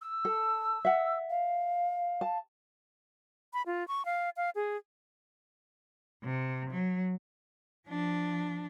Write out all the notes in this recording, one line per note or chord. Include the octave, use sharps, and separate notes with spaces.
E6
A4
E5 F#5
F5
A5
B5
F4
C#6
F5
F5
G#4
C3
F#3
F3 D4